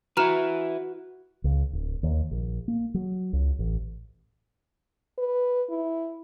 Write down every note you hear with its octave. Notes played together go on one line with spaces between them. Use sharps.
E4 F#4 B4 A#5 F6 E7
C#2
D1
D#2
A#1
A#3
F#3
C#2
A1
B4
E4